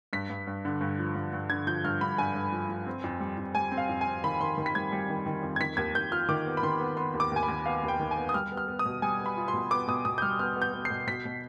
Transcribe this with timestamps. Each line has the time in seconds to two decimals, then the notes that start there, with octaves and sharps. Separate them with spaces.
0.13 G2 B6
0.30 G2
0.47 G2
0.65 D3
0.81 G2
0.99 F3
1.15 G2
1.33 G2
1.50 D3 G#6
1.67 F3 G6
1.84 G2 F6
2.01 G2 B5
2.18 G2 G#5
2.35 G2
2.52 F3
2.69 F3
2.87 C4
3.04 F2
3.20 G3
3.38 F2
3.55 G3 G#5
3.72 C4
3.78 F5
3.89 F2
4.01 G#5
4.06 C4
4.24 D#3 B5
4.41 D#3 C6
4.58 D#3
4.66 B6
4.75 G3 G#6
4.92 G3
5.10 D#3
5.26 D#3
5.43 F2
5.56 G#6
5.60 D#3 B6
5.77 D#2 G#6
5.95 D#2 G6
6.12 F4 F6
6.28 D#3 D6
6.46 B3
6.57 B5
6.63 D#3 C6
6.80 B3
6.97 B3 C6
7.14 D#2
7.20 D6
7.32 D#2 G#5
7.43 B5
7.48 D#2
7.66 B3 F5
7.83 D#2
7.88 G5
8.00 D#3
8.11 G#5
8.16 B3
8.29 D#6
8.34 G3 F6
8.51 B3
8.57 F6
8.68 B3
8.79 D#6
8.85 B2
9.02 G3 G#5
9.20 B3
9.26 B5
9.37 F4
9.48 C6
9.54 B2
9.71 B3 D6
9.87 B2 D#6
10.05 B2 D#6
10.18 G6
10.22 G3 F6
10.39 B3 F6
10.56 B3
10.62 G6
10.74 B3
10.85 B2 C7
11.07 B2 B6
11.25 B2